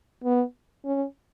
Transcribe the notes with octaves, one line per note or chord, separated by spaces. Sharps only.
B3
C#4